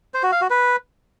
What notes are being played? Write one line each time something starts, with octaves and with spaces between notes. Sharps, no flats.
C5
F#4
F5
F#4
B4